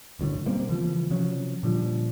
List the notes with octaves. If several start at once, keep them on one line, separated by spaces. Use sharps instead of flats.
G1 F#2 A2 D3
B2 G3 A#3 C4
C#3 E3 F3
C3 F3 F#3 C#4
A#2 D3 F3 G3